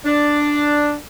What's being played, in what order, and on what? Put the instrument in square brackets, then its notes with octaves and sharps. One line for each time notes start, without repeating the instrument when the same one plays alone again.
[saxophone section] D4